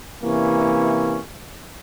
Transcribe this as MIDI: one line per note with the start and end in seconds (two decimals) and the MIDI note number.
0.22 1.18 48
0.22 1.18 52
0.22 1.18 58
0.22 1.18 61